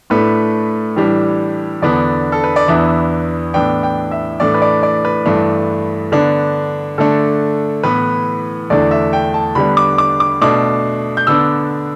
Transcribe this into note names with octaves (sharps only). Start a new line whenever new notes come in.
A2 A3 D4 B4
A2 E3 G3 D4
E2 D3 B3 D4 D5
A4
B4
D5
E2 E3 B3 D4 E5
A2 E3 B3 D4 G5
G5
E5
A2 E3 A3 D4 D5
B4
D5
D5
B4
G2 E3 A3 D4
D3 B3 D4
D3 A3 D4 A4
A2 E3 B3 B4
E2 D3 A3 D4 D5
E5
G5
A5
D3 G3 B3 D4 B5
D6
D6
D6
B2 A3 D4 D6
G6
D3 B3 D4 E6